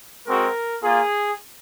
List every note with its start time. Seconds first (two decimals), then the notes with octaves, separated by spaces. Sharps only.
0.27 G#3 C4 F#4 A#4
0.82 A#3 F4 G#4